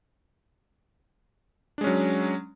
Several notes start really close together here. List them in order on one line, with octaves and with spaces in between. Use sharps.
D4 G#3 C#4 F#3